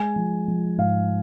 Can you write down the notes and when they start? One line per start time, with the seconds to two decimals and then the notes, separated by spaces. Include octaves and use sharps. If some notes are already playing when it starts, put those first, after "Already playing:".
Already playing: G#3 G#5
0.16 F3
0.48 F3
0.78 G#2 F5